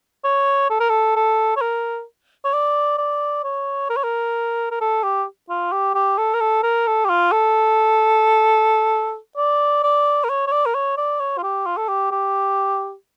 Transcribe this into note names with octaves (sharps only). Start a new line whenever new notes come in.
C#5
A4
A#4
A4
A4
C#5
A#4
C#5
D5
D5
C#5
A#4
C#5
A#4
A#4
A4
G4
F4
G4
G4
A4
A#4
A4
A#4
A4
G4
F4
A4
D5
D5
A#4
C#5
C#5
D5
A#4
C#5
D5
C#5
F4
G4
F4
A4
G4
G4